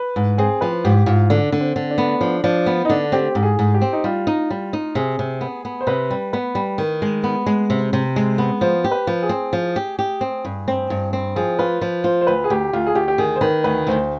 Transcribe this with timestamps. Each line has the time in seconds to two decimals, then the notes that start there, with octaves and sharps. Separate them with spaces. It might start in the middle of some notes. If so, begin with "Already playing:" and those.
Already playing: B4
0.16 G#2
0.38 C4 G#4
0.61 F3 B4
0.84 G#2 G4
1.06 G#2 F4
1.30 D3 D4
1.52 D3
1.60 C4
1.76 D3
1.91 D4
1.98 B3
2.21 F3 D4
2.44 F3 D4
2.66 B3
2.85 D#4
2.89 D3 D4
3.12 C4 G4
3.35 G#2
3.43 G#4
3.59 G#2
3.74 G4
3.82 C4
3.93 D#4
4.04 G3 F4
4.27 D#4
4.50 G3
4.73 D#4
4.95 C3 G#4
5.19 C3
5.41 B3
5.65 B3
5.81 C5
5.87 C3 B4
6.11 G3
6.33 B3 B4
6.55 G3
6.78 D#3
7.02 G#3
7.24 B3
7.46 G#3
7.70 C3
7.93 C3
8.16 G#3
8.38 B3
8.61 F3 C5
8.84 G4
8.91 B4
9.07 F3
9.23 G#4
9.29 C4
9.53 F3
9.76 G4
9.99 G4
10.21 C4
10.45 G2
10.68 C4
10.90 G2
11.13 C4
11.36 F3 G#4
11.59 F4 B4
11.81 F3 B4
12.04 F4 C5
12.21 C5
12.27 D2 B4
12.44 G#4
12.50 D2 G4
12.73 D2 F4
12.87 G#4
12.95 D2 G4
13.08 G4
13.18 D#3 G#4
13.36 C5
13.41 D#3 B4
13.64 D2 B4
13.87 D2 C5